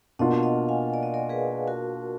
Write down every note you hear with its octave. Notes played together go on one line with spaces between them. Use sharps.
B2 A#3 D4 F4 D#5 F#5
F5
D#5 F#5
F5 G#5
D5
D#5
A#4 D5
G#4 B4
F#4 A#4